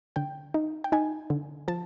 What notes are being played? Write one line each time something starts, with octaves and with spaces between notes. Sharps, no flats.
D3 G5
D#4
G5
D#4 G#5
D3
F3 A5